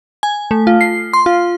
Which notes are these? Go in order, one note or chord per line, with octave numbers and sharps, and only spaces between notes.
G#5
A3
F4
C7
C6
F4